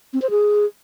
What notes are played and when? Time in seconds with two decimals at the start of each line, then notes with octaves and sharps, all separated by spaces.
0.13 C4
0.22 C5
0.30 G#4